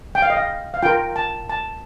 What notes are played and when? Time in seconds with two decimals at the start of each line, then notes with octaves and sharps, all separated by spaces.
0.15 G5
0.22 F5
0.30 D#5
0.37 F5
0.74 F5
0.82 F4 A#4 G5
1.16 A5
1.49 A5